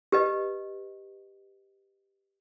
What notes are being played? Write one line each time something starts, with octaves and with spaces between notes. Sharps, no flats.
G4 B4 D#5